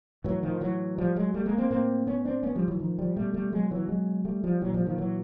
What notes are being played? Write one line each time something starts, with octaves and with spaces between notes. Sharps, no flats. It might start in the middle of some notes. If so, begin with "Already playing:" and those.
A2 E3 F#3
D#3 F3
E3 F#3
F3 G3
F#3 G#3
G3 A3
G#3 A#3
A#3 C4
A2 A#3 C4
B3 C#4
C4 D4
B3 C#4
F3 G3
E3 F#3
D#3 F3
F3 G3
B2 G3 A3
G3 A3
F#3 G#3
E3 F#3
F#3 G#3
G3 A3
F3 G3
A#2 E3 F#3
F3 G3
D#3 F3
E3 F#3